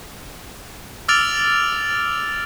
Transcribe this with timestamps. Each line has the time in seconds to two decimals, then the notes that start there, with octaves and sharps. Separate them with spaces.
1.08 D6 E6 F6 A6 D7 F7